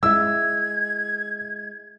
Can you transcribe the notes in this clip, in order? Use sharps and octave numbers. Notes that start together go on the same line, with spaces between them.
G#3 E4 E5 E6 G#6